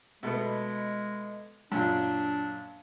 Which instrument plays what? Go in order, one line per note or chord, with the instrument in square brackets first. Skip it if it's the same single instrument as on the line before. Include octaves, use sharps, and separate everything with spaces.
[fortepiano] B2 A3 B3 [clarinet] G#3
[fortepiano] F#2 A#2 [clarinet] D4